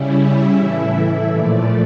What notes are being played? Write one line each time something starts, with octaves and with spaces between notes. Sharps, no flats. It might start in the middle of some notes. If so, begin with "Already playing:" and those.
Already playing: C#3 G3 C#4 E4
E5
A2 E3 A3 E4 E5
E5
A#2 F3 A3 D5